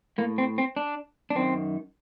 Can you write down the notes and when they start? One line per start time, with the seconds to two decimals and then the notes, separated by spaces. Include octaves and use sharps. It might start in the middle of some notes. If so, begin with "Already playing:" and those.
0.18 A2 A#3
0.38 C4
0.58 C4
0.77 D4
1.30 D4
1.35 F#2 D#3 C4